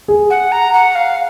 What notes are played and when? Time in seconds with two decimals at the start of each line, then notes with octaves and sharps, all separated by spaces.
0.08 G#4
0.30 F#5
0.52 A#5
0.73 F#5
0.95 F5